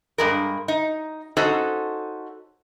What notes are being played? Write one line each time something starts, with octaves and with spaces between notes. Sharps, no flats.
G2 G#3 A#4
D#4
C#4 D#4 F#4 A4 C5